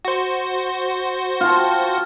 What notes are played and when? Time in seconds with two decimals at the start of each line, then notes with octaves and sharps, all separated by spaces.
0.05 F#4 C5
1.41 F4 G5 A5